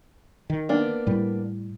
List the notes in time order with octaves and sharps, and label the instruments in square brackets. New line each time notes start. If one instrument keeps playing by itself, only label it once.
[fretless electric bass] D#3
[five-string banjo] A#3 B3 D4
[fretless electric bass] A2 G3